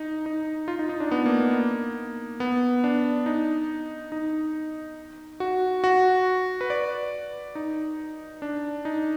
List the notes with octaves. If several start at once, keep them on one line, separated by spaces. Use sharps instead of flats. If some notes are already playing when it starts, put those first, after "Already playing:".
Already playing: D#4
D#4
F4
D#4
D#4
D4
B3
A#3
A#3
B3
D4
D#4
D#4
F#4
F#4
B4
D5
D#4
D4
D#4